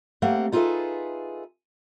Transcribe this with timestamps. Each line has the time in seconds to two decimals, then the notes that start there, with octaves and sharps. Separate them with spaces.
0.22 A3 A#3 C4 G4 F5 F#5
0.52 D#4 F4 G#4 A4 B4 E5